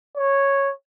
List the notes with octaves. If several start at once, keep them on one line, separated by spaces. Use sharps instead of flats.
C#5